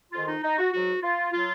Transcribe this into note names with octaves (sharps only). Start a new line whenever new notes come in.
F2 D#3 G#3 F4
D#4
D#4
F#4
G#2 F#3 F#4
F4
F#3 F4